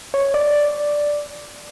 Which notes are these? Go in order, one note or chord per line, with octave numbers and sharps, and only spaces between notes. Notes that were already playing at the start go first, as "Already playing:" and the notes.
C#5
D5